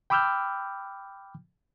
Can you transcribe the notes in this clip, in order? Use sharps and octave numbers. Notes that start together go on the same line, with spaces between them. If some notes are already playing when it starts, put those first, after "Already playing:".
G5 B5 D6 E6 F6 G6